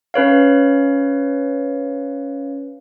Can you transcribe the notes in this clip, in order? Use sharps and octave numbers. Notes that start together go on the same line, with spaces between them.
C#4 B4 C#5 F5